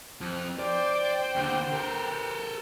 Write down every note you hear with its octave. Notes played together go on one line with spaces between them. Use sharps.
F2
C5 D5 G5
D#2 D3
A4 A#4